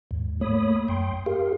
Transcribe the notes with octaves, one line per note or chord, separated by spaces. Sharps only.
D#2 G#2
A3 A#3 C#5 B5 D#6
F#2 G5 C6
G4 G#4 A#4 F5